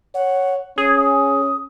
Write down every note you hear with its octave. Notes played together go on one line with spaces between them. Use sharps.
C#5 F#5
C#4 G#4 D#6